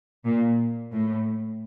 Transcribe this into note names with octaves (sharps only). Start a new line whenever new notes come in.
A#2
A2